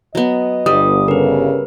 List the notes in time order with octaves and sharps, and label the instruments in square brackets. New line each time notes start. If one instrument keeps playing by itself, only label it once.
[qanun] F#3 B3 [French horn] D#5
[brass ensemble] G1 [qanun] G3 [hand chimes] D#6
[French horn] C#3 [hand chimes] A#4 B4